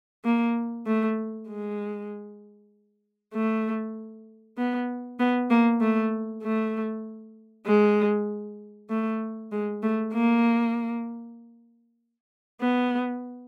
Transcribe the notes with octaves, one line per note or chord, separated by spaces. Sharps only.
A#3
A3
G#3
A3
B3
B3
A#3
A3
A3
G#3
A3
G#3
A3
A#3
B3